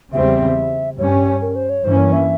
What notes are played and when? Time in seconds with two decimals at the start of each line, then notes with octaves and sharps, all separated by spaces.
0.13 E2 C#3 G3 C4 E5
0.98 G2 G3 C#4 C#5
1.41 A#4
1.56 C5
1.70 C#5
1.84 G2 E3 A#3 C#4 C5
1.98 C#5
2.12 E5